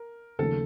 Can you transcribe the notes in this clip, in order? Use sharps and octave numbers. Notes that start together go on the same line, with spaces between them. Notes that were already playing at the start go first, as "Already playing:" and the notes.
Already playing: A#4
D#2 C#3 F3 A3 A4